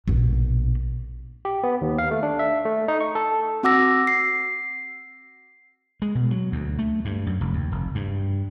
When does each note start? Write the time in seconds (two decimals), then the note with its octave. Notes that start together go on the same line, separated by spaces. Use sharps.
0.08 A#1 B2
1.45 G4
1.64 B3
1.81 D#2
1.98 F5
2.11 A3
2.23 D4
2.39 E5
2.65 A3
2.88 D#4
3.00 C#6
3.15 A4
3.63 C4 F#4 F#5 D6 E6 A#6
4.07 C7
6.02 G#3
6.15 B2
6.31 F#3
6.52 D2
6.79 A3
7.05 G2
7.26 F#2
7.41 F1
7.53 D#2
7.72 F1
7.95 G2